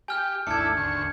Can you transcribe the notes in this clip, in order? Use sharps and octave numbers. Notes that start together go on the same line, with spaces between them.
G4 G#5 F6 G6
G#1 D#2 D#3 A3 D4 E4 G#6 C#7
D2 C#6